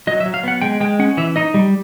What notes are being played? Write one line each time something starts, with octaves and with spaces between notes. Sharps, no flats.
F#3 D#5
E5
F#3
F5
B3 F#5
G#3 G5
G#3 G5
C#4 F#5
E3 E5
D#4 D#5
G3